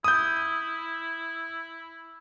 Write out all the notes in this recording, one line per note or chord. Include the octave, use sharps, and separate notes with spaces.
E4 D#6 G6